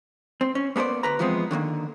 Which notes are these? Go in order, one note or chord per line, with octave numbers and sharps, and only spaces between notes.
C4
C#4
A#3 B3 A4 C5 D5
D2 B4 A#5
E3 F3 G#3 B3 C4
D3 D#3 F#3 A#3